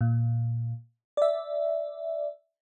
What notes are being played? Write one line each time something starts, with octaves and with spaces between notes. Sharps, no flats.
A#2
D5 E5